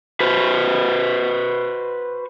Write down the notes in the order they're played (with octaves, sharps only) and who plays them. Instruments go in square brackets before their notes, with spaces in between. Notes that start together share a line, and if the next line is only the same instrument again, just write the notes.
[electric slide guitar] F#4 B4 C5